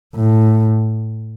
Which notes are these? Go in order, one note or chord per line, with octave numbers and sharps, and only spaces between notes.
A2